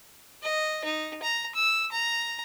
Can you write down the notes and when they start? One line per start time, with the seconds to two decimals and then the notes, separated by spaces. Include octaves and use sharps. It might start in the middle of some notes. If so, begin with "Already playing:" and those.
0.42 D#5
0.85 D#4
1.22 A#5
1.55 E6
1.92 A#5